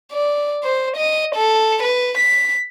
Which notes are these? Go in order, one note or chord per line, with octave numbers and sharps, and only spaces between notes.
D5
C5
D#5
A4
B4
B6